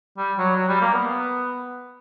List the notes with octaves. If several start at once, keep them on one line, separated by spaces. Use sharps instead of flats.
G3
F#3
F#3
G3
A#3
B3